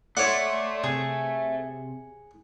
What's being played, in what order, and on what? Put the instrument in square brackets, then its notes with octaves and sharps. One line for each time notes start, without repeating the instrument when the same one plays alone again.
[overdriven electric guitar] A3 [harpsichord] C#5 F#5 [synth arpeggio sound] D5 C6
[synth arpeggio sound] C3 [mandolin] G#4